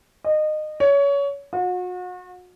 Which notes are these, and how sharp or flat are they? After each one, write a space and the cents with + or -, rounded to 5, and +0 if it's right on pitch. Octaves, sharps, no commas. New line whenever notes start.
D#5 -25
C#5 +25
F#4 -40